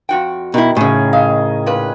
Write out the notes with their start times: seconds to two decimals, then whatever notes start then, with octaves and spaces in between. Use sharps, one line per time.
0.09 F2 F#4 G5
0.54 B2 D#3 E4
0.77 A2 C#3 G#5
1.13 D#5 F5
1.66 A#2 B4